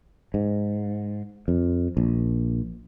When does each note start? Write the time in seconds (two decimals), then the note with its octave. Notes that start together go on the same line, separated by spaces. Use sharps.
0.34 G#2
1.48 F2
1.97 A#1